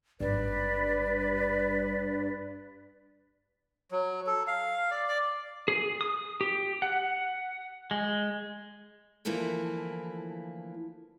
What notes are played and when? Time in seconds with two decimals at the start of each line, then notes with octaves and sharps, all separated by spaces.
0.20 G#1 G2 G3 B4 D5
3.91 F#3
4.27 A4
4.47 F5
4.91 D5
5.08 D5
5.68 G#4
6.01 D#6
6.41 G4
6.82 F#5
7.91 G#3
9.25 D2 E3 F3 A#3 E4 A4